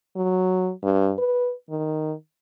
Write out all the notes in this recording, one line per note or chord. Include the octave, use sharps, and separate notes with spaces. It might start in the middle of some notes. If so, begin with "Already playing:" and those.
F#3
G2
B4
D#3